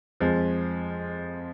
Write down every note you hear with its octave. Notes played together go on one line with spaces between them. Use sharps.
F2 F3 G#3